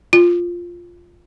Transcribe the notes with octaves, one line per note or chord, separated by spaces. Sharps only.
F4